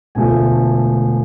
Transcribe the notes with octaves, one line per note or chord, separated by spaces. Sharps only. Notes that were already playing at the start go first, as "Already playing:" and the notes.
E1 D2 D3 F3 A3 G#5